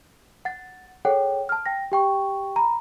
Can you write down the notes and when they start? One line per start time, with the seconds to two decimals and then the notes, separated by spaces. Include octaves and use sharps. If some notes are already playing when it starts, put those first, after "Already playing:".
0.45 F#5 A6
1.05 G#4 A4 C#5 F#5 G5
1.49 A5 F6
1.66 G5 A#6
1.92 G4 G5 C#6
2.56 A#5 B5